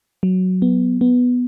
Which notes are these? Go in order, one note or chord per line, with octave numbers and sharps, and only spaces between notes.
F#3
B3
B3